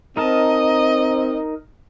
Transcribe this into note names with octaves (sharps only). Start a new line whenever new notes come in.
C4 D#4 A#4 D#5 A5